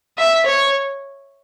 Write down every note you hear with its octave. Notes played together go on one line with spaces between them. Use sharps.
E5
C#5